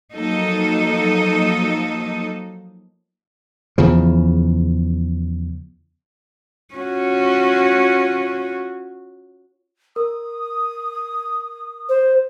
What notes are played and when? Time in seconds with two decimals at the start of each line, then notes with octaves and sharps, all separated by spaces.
0.14 F3 F#3 A#3 D#4 A4 D#5
3.78 E2 C#3 F3
6.75 C#4 F4 F#4
9.96 A#4 D#6
11.89 C5